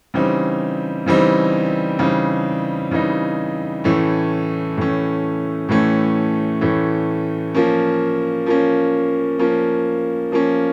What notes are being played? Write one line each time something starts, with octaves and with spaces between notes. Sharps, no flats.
C#3 E3 G3 C4 D#4
C#3 E3 G3 C4 D#4
C#3 E3 G3 C4 D#4
C#3 E3 G3 C4 D#4
A2 E3 A3 C#4
A2 E3 A3 C#4
A2 E3 A3 C#4
A2 E3 A3 C#4
F3 A#3 C#4
F3 A#3 C#4
F3 A#3 C#4
F3 A#3 C#4